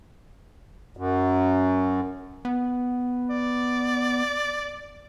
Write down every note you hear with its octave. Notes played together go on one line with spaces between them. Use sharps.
F#2
B3
D5